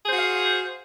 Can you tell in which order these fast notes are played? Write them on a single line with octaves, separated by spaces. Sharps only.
G#4 C5 F#4 F5